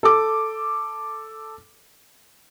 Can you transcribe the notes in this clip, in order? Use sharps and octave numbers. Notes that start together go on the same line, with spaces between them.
A4 D6